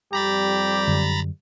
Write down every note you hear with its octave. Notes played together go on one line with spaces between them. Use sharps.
F2 G3 G4 A#5 B5 A6
F#2 D3